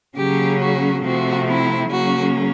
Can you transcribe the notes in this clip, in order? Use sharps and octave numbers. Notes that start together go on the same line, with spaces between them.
C#3 F#3 A#3 C#4 G4
F#4
C3 F3 A3 C4 F#4
E4
C#3 F#3 A#3 C#4 F#4